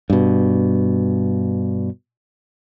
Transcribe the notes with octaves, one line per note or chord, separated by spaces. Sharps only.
G2 B2